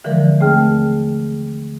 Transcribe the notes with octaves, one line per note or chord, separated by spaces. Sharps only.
D3 E3 F3 G#3 A#4
D#2 A3 C4 G#4 G5 F6